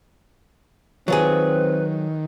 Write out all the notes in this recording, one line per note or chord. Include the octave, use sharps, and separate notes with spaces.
D#3 F#3 C4 F4 G#4 B4